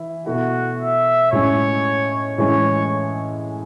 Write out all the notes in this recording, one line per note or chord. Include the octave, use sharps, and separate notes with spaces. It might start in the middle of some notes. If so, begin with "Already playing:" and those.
Already playing: E3 E4
B2 A3 E4 F#4
E5
A2 G#3 C#4 C#5
A2 E3 G#3 C#4 C#5